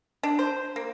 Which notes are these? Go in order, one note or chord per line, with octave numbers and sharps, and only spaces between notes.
D4
C5
A#3